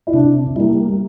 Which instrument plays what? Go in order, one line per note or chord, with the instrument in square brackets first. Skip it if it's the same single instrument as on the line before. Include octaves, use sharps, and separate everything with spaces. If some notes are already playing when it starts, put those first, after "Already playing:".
[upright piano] E4
[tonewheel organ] C3 [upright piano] D4
[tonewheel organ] G3 A#3 [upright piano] E4